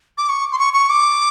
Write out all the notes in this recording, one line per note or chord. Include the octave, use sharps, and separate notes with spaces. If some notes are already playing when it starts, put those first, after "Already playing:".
D6
C#6
C6
C#6
C#6
D6